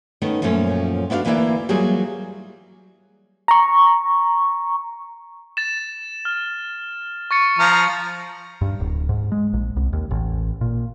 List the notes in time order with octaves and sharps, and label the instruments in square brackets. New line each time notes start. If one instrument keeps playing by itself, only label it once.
[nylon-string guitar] D#3 A3 B3 C#4
F#2 A#2 F3 A3 C#4
B3 D4 E4 F#4 F5
D2 E3 A#3 D4 E4 D5
E3 F#3 G3 A#3 F4 G#4
[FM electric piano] A#5 C#6
[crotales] A6 E7
F6
C#6 A6 C#7
[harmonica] F3 A#5 F6
[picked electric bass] G2
D1
G#2
G#3
A#1
C2
D#2
A1
A#2